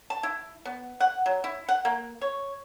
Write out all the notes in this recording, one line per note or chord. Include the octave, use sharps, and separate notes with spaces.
A5
E4
B3
F#5
F#3
E4
F#5
A#3
C#5